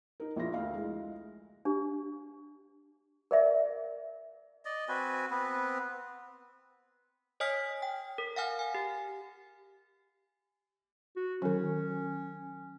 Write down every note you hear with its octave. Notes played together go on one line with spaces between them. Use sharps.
D#4 A#4
A#1 E4 F4 E5 A#6
D2 E4 F5
G#3
D4 G4
A#4 D5 E5
D5 D#5
C4 F#4 B4 G#5
B3 C4 B4
C#5 D#5 G#5 D#6 F6 B6
G5
A#4
F5 F#5 G#5 F6
G#5
G4
F#4
D#3 F#3 C#4